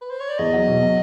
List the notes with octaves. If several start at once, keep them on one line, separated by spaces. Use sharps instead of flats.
B4
C5
C#5
D5
E2 D#5
F#3
B2
F#3